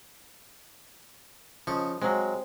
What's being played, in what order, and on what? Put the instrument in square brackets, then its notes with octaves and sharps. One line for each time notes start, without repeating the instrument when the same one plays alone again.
[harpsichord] C#3 D#5 C#6 [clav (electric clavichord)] F3
[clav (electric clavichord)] F#3 G#3 [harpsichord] C4